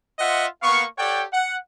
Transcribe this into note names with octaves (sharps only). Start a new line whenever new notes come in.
F4 C5 D#5 E5 F#5
A#3 B3 F5 C#6
G4 A4 C#5 D5 F#5 G5
F#5